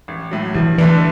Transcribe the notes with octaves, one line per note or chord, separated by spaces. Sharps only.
A1
A2 F#3
G2 E3
D3 E3 A3 D4